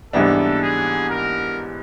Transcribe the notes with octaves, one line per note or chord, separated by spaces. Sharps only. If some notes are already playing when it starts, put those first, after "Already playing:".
G#2 E3 G3 B3 D4 A4
G#4
A#4